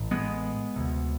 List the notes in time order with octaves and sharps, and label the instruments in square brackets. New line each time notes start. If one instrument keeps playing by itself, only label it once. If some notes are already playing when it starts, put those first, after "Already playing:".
Already playing: [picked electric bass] A1 A2
G#3 B3
D2 C3